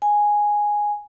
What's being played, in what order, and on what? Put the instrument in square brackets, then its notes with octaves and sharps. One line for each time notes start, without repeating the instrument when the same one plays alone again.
[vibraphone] G#5